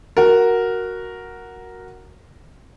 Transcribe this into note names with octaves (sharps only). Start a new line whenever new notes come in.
F#4 A#4